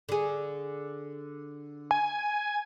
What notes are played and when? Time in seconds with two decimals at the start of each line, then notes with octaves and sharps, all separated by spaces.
0.09 D3 G#4
1.91 G#5